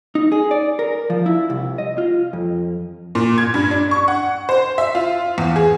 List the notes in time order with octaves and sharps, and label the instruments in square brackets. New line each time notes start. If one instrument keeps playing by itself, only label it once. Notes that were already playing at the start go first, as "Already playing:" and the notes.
[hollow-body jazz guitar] D#4
G#4
D5
A#4
F3
E4
C2
D#5
F4
F2
[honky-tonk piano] A#2
G#6
G2
D4
C#6
F#5
C5
E5
F4
E2
G#4